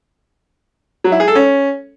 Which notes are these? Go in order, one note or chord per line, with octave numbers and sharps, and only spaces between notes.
F#3
E4
G#4
A4
C#4